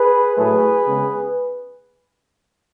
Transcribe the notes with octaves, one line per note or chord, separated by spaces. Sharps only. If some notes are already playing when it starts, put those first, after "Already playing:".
Already playing: G#4 B4
A2 F#3 A3 G#4 B4
C#3 G#3 B3